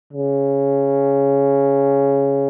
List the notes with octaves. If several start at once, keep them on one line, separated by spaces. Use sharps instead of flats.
C#3